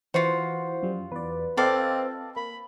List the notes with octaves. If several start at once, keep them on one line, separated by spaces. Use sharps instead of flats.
E3 F4 F#4 C5 F#5
F#2 F3 G3
E2 B4 D5
C4 F4 A4 D5 D#5 F5 G5
A#3 B5